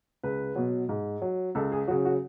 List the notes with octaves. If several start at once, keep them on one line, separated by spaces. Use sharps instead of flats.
C#2 B4
B2 F#3
G#2
F#3
C#2 A4
G#4
C#3 F#3 F#4
F#4